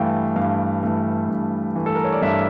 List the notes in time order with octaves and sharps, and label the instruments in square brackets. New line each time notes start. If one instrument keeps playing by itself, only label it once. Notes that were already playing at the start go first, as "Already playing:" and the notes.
Already playing: [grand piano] G2 E3 A3 F5 G5
G2 F5
E3 A3
G2
E3 A3
A4
A#4
C#5
D5
G2 E5